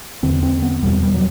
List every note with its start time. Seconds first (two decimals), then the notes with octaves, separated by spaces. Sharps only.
0.23 E2 D3 C4
0.43 C4
0.62 B3
0.82 E2 B2 G3
1.03 G3
1.14 F#3